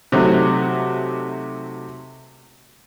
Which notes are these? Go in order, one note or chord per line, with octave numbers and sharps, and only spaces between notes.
C3 F#3 A3 D#4 F#4